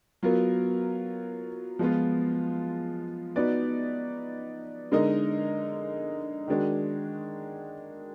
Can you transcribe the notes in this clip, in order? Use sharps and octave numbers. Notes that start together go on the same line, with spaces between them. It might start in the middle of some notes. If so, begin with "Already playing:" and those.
F#3 B3 F4 A#4
F3 G#3 B3 F4
B3 D#4 F#4 B4 D5
D3 G#3 D#4 A#4 D#5
D#3 G#3 D4 F#4